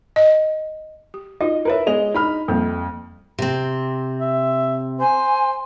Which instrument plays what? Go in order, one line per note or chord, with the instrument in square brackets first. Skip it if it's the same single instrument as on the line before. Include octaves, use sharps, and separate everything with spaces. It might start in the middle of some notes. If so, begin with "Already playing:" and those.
[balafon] D#5
G4
[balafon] D#4 F4 F#4 [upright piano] D#5
[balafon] E4 C#5 [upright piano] A#4 B4 E5
[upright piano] G#3 D#5 F7 [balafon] B3
[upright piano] D#4 B5 F6 [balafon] E4
[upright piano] F2 [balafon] G3 A#3 C4
[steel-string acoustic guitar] C3 C4
[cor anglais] E5
[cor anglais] C5 [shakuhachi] G#5